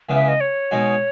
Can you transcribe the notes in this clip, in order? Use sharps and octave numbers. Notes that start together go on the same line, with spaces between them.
C#2 C#3 E3 B3
E5
D#5
C#5
B2 G#3 D#4 F#4